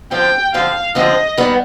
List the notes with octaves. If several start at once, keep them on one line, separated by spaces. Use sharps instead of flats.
D3 F3 C4 F4 G5
D3 F3 C4 F4 F5
D3 F3 C4 F4 D#5
D#3 G3 B3